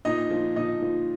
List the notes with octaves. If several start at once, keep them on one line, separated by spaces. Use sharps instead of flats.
A#2 D#4 D#5
F3
A#2 D#4 D#5
F3